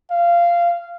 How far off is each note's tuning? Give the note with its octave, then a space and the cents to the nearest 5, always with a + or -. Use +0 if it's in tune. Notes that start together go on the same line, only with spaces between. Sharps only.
F5 -15